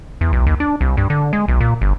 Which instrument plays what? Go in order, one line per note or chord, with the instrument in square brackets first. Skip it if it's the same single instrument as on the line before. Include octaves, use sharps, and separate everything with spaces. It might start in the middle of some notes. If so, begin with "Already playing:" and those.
[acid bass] E2
B1
D#2
D4
C2
G2
D3
G#3
B1
A#2
G1